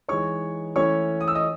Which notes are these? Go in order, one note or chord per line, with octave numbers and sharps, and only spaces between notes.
E3 G#3 D#4 C#5 C#6
E3 A3 C#4 E4 C#5 C#6
D#6
E6
D#5 D#6